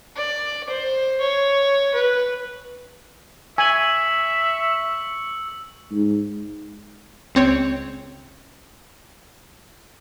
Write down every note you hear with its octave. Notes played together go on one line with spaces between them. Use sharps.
D5
C5
C#5
B4
E5 G#5 C#6 E6 F#7
G#2
C#2 C4 C#5